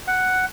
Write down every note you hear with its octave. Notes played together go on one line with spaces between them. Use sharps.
F#5